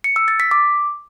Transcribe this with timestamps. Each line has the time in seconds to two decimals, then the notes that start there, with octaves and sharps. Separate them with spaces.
0.04 C#7
0.16 E6
0.28 A6
0.40 B6
0.51 D6